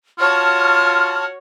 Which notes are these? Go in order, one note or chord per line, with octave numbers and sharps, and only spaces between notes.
F4 F#4 C#5 A5 F6